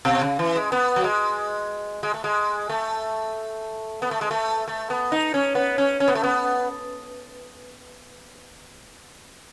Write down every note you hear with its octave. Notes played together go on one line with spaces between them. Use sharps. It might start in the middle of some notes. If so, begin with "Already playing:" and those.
B2
C#3
E3
G#3
B3
F#3
G#3
G#3
A3
G#3
A3
B3
A3
G#3
A3
A3
B3
D#4
C#4
B3
C#4
C#4
B3
A3
B3